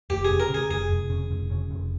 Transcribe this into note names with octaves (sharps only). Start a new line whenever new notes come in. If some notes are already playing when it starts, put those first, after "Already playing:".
F1 G4
C#3 G#4
A#4
C#3 G#4
F1 G#4
F1
C#3
F1
C#3
F1